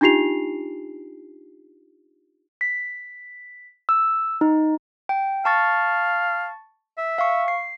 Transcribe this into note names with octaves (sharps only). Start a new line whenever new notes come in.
D4 D#4 F4 G4 C7 F7
B6
E6
D#4
G5
F5 A5 C#6 A6
E5
F5 C#6
C7